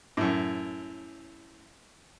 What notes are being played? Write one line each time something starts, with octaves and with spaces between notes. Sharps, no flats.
F#2 A2